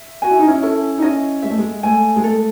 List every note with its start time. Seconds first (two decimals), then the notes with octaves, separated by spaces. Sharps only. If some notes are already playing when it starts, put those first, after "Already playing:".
Already playing: E5
0.22 F#4 G#5
0.31 E4
0.39 D#4
0.47 C#4 E4
0.62 C#4 E4 A4
0.98 D#4
1.02 C#4 E4 D#5
1.43 G#3 E5
1.50 A3
1.58 G#3
1.83 A3 G#5
2.16 G#3
2.24 A3 A4